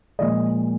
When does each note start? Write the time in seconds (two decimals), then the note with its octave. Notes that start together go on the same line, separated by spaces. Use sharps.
0.19 A#2 F3 G#3 D#5